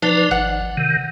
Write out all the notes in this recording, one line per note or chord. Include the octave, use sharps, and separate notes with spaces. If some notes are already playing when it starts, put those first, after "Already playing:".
F3 D4 D#4 B4
G#1 F#5
C3 D#3